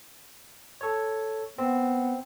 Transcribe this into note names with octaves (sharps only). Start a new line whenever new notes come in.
A4 C#5
B3 C4